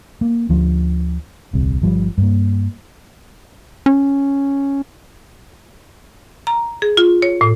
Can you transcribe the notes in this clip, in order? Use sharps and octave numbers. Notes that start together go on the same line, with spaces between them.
A#3
D2 D3 F3
D#1 C2 C3
G1 F3 G3
G2 A#3
C#4
A#5
G#4
F4
C#5
A2